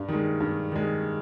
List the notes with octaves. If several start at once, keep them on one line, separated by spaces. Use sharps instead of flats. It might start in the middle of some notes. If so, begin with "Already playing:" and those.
Already playing: G2
D#3 G#3
G2
D#3 G#3